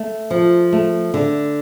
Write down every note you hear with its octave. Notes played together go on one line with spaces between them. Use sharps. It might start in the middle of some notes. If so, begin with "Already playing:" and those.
Already playing: A3
F3
A3
D3